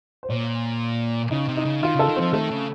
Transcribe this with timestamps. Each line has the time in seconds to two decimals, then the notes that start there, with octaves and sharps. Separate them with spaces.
0.23 C5
0.29 A#2 C#5
1.31 C#3 D#4
1.48 C3
1.57 D#4
1.65 C#3
1.82 D#3 F4
1.95 C#3 A4
2.09 D#3
2.16 F3 C4
2.33 D#3 A3
2.51 C#3